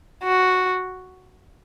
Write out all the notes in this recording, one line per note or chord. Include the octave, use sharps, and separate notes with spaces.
F#4